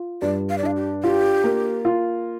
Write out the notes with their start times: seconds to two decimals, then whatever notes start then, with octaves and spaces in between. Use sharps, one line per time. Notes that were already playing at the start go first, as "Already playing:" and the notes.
Already playing: F4
0.22 G2 D5
0.50 F5
0.58 D5
0.63 D4 F5
0.76 G4
1.04 F4 G4
1.44 A#3
1.85 F4